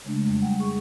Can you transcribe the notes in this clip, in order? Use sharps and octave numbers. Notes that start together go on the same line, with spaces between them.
C#3 G#3 A3 D4
F2 G3
F#5 G5
G#4 C#6